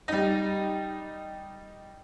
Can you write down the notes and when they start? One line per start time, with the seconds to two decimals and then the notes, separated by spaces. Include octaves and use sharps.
0.08 G3 D#4